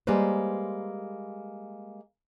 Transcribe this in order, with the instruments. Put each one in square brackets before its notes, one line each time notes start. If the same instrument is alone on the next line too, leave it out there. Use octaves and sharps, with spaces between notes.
[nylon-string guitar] G3 G#3 A#3 B4 C5